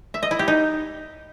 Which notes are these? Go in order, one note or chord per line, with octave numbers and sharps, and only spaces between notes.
E5
D#5
E4
G4
D#4